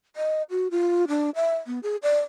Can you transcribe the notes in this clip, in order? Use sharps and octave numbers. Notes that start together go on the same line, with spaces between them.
D#5
F#4
F4
D4
E5
B3
G#4
D5